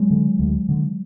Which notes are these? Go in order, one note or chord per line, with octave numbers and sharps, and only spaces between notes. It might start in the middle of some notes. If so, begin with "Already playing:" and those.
Already playing: F#3 G#3
D3
D2
D3